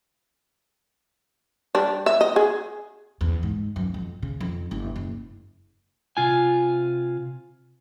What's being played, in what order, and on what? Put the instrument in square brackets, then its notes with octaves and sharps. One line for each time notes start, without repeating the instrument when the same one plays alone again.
[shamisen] G3 D4
E5
D#5
G#4
[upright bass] E2
G#2
F#2
F2
C#3
F2
F#1
F#1
[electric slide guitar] C3 F4 G#5